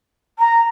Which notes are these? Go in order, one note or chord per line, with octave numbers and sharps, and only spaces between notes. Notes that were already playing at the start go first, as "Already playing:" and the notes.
A#5